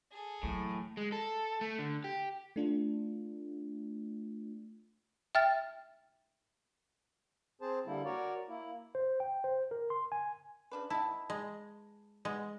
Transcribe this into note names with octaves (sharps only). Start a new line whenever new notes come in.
G#4 A4
A2 E3 F#3
G#3
A4
A3
D3
G4
A3 D4 F4
E5 G5 F6 A6
C4 G#4 C5 A5
D3 G3 A#3 E4
F#4 A#4 C#5 D5
A#3 E4
C5
G5
C5
A#4
C6
G#5
C#3 D4 B4
B3 D#4 E4 A5
G#3
G#3 B3